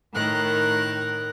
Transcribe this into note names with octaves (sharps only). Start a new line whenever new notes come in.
A2 D#3 A#4 F#6